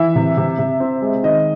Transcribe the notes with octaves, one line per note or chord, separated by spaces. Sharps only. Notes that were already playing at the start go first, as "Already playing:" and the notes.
Already playing: E3 E5
C3
C3
C3
C4
G#3
D#3 D#5